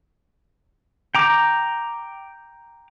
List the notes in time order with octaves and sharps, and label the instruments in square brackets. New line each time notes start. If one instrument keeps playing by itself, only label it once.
[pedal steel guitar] G5 A#5 D6